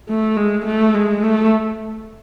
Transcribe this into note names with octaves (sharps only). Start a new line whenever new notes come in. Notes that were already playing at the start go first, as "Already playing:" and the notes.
A3
G#3
A3
G#3
A3